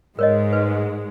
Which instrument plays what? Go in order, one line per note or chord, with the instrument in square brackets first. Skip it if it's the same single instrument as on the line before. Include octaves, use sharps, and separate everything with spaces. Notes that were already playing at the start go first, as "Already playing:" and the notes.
[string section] G#2 G#3 [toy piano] A#4 C#5 D#5
[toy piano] B4